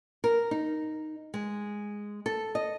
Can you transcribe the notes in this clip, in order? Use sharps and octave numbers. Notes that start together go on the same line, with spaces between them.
A#4
D#4
G#3
A4
D#5